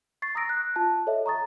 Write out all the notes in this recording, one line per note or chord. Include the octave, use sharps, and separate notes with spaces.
C#6 A6 C7
A#5 D#6 E6 A#6 D7
F#6
F4 A5
A4 C#5 D#5 E5
A#5 C#6 D#6 A6